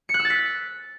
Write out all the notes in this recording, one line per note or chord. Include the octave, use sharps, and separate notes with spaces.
C#7
F#6
E6
A6
B6